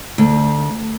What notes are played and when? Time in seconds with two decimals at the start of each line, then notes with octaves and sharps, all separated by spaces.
0.18 D2